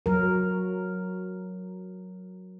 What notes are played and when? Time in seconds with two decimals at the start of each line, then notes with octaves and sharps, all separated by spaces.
0.06 F#3 A#4